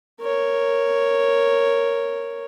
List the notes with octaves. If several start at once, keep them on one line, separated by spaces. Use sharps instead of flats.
A#4 C#5